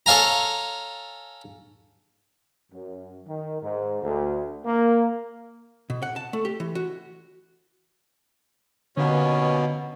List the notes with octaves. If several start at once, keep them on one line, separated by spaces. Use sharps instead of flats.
A4 C#5 F5 G#5 A#5
F#2
D#3
G#2
D2
A#3
B2
F#5
A5
A3
G4
E3
F#4
D#2 B2 D3 B3 C#4